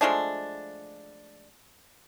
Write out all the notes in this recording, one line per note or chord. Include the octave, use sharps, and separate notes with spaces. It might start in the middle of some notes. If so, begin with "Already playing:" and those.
F3 G#3 A3 D4